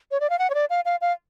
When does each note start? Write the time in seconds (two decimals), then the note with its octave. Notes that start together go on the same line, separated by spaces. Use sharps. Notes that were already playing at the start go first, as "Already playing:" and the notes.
0.11 C#5
0.20 D5
0.30 F5
0.39 F#5
0.50 C#5
0.54 D5
0.70 F5
0.85 F5
1.01 F5